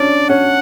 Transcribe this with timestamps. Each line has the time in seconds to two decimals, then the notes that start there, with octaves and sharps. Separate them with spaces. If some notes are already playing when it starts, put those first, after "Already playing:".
Already playing: C#4 D4 D5
0.29 C#4 F#5